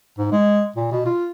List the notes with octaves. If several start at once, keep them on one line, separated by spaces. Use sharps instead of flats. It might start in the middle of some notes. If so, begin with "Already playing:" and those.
G#2
G#3
A#2
B2
F4